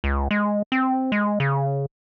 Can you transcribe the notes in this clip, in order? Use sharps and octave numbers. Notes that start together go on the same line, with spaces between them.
C#2
G#3
C4
G#3
C#3